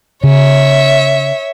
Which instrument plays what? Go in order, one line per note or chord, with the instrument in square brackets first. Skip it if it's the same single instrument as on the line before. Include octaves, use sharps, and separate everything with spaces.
[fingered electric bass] C#3 [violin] C#5 E5